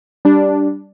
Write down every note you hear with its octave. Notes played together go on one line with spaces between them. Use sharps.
G3 D4